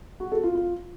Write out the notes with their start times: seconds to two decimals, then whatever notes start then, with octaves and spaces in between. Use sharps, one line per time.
0.20 F#4
0.32 A4
0.43 F4
0.55 F4